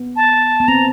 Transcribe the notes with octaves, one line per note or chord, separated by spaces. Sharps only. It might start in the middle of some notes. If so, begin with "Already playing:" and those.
Already playing: B3
A5
B3
C4 A#5